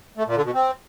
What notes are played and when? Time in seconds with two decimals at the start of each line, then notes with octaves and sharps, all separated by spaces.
0.17 A3
0.26 A#2
0.36 D3
0.45 B2
0.54 C4